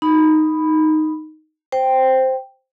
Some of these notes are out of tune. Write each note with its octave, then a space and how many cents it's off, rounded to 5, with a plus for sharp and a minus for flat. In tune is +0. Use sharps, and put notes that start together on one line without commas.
D#4 +0 B5 +0
C5 +0 G5 +0